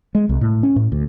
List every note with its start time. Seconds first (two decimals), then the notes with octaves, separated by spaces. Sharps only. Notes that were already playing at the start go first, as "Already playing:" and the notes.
0.15 G#3
0.29 C2
0.41 A2
0.63 C#4
0.76 A2
0.92 D2